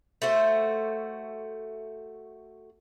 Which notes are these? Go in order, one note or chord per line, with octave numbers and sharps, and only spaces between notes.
A3 F#4 C5